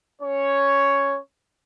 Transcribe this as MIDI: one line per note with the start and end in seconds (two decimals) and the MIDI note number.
0.21 1.19 61
0.21 1.19 73